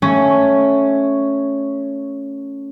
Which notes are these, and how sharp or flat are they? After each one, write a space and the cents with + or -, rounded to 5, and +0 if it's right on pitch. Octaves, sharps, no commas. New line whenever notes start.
A3 +0 C#4 +0